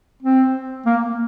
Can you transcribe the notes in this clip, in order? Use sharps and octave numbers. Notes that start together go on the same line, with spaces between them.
C4
A#3